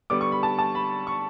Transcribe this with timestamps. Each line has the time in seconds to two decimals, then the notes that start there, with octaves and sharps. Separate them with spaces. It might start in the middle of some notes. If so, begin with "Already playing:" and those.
0.10 D3 G3 B3 D6
0.21 C#6
0.32 B5
0.43 A5
0.59 A5
0.75 B5
1.07 C#6